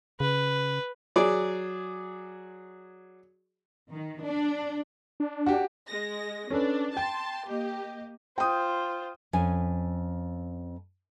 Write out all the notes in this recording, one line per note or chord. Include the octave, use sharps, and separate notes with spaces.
C#3 B4
F#3 G#4 D5
D#3
D4
D4
F#4 G4
G#3 A#6
C#4 D4 A4 B4
G5 A5 C6
A#3 G4 D#5
F4 C5 G5 D#6
F2 C#4 G#5